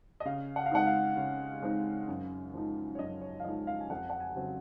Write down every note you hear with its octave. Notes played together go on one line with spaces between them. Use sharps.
D#5
C#3 F5
F#5
F5
G#3 C4 D#4 F#5
F5
C#3
G#3 C4 D#4
F#2
F3 G#3 D#4
C#5
F#2 D#5
C#5
F5
F3 G#3 D#4 D#5
F5
G#5
F2 F#5
F#5
G#5
C#3 F#3 C4